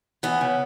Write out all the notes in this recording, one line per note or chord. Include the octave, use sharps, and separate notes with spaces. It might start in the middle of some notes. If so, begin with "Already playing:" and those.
E3 B3
C#3